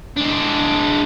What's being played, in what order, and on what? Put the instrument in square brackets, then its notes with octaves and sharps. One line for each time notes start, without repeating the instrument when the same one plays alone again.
[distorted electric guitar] G#3 D4